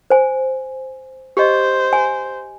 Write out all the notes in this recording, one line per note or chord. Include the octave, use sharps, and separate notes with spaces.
C5 G#5
G4 C5 D#5
G#5